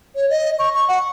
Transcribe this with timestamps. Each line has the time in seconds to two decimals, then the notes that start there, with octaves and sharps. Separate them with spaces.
0.16 C#5
0.30 D#5
0.59 C#6
0.74 C#6
0.88 F#5